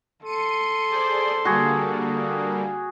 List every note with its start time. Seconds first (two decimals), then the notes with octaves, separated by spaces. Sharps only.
0.25 A4 C6 C#7 D#7
0.90 G#4 C5 D5
1.45 D3 G3 A#3 F#4 G#4